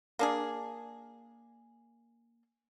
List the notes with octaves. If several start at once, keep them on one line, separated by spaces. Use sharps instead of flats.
A#3 D4 G#4